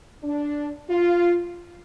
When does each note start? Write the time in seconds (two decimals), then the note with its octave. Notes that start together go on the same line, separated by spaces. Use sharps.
0.23 D4
0.90 F4